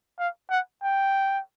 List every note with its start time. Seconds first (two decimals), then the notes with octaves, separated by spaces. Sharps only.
0.19 F5
0.50 F#5
0.83 G5